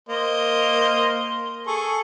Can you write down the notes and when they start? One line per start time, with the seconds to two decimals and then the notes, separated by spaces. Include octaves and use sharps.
0.09 A#3 C5 D#5
1.67 G#4 A4 C#6